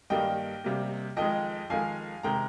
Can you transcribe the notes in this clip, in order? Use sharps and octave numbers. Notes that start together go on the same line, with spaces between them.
G2 D#3 G3 A#3 D#5 G5
C3 G3 A#3
F2 D#3 G#3 D#5 G5
F2 D#3 G#3 F5 G#5
C3 D#3 G#3 G5 A#5